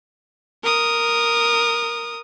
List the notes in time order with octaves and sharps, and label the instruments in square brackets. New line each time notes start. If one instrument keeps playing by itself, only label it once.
[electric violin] A#4 D#6